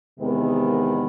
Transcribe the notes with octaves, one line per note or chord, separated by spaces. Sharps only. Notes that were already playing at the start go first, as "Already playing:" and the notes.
E2 C3 D#3 G#3 B3